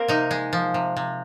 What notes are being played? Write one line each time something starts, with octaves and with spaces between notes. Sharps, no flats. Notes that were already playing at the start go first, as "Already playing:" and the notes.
Already playing: A#3 C4 A#4
C3 D#4
G#3
F3
C3
C3